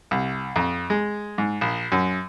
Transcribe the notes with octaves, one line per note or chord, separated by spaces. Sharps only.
C2
F2
G#3
G#2
A#1
F#2